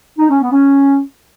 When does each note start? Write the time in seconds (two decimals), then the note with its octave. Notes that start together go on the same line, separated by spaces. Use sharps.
0.19 D#4
0.29 C#4
0.40 B3
0.51 C#4